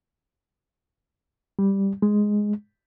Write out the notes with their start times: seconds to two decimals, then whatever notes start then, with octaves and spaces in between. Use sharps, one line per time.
1.59 G3
2.02 G#3